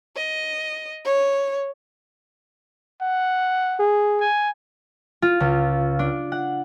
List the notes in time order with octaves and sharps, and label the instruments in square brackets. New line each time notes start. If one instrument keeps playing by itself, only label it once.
[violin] D#5
C#5
[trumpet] F#5
[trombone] G#4
[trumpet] G#5
[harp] F4
C#2
D4
F#5